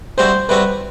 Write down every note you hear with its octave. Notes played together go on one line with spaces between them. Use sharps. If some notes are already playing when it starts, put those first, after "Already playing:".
C3 G3 C4 F#4 C5
C3 G3 C4 F#4 B4